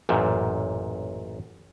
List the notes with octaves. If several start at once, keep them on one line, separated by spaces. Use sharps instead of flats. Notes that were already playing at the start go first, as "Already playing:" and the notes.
A1 F#2 A#2